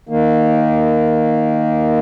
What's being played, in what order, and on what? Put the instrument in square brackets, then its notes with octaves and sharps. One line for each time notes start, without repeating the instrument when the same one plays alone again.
[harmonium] D#3 A#3